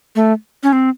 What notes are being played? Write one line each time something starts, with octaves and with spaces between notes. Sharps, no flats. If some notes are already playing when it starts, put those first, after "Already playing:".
A3
C#4
C4